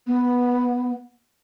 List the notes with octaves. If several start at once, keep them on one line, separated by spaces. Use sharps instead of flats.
B3